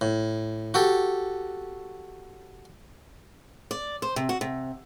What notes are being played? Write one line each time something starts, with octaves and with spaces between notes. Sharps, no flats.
A2
F#4 G4 A4
D5
C5
C3
F#4
C3